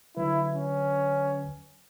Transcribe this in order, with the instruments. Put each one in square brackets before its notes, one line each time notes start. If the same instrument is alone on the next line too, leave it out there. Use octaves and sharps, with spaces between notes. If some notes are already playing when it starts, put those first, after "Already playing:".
[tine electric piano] D3 F#3 B4 [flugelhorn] E4
[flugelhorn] C#4